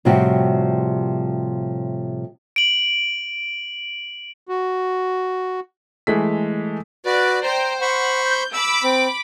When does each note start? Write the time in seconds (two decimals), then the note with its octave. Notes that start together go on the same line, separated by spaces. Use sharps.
0.05 A2 C3 F3 G3 F#4 G4
2.56 D7 F#7
4.49 F#4
6.07 E3 G#3 A3 B6
7.06 F#4 B4 D5
7.43 C5 G5 A#5
7.81 C5 F#5 B5 C#6
8.23 G6
8.53 B5 D6 E6
8.83 C4